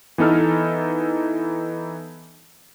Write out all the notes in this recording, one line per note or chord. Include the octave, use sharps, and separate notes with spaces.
E3 B3 D#4 A4 F6